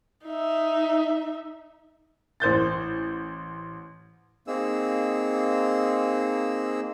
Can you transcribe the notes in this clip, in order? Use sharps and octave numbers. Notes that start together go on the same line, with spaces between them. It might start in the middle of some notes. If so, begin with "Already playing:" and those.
D#4 E5
A1 C5 G6 A6
A#3 C4 D#4 G#4 E6